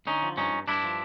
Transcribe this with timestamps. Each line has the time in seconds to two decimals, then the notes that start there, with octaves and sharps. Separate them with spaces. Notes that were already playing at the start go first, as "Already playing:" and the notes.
0.07 D3 C#4 D#4
0.22 F3
0.37 G2 C#4 D#4
0.53 G2
0.68 G2 D4 E4
0.84 F3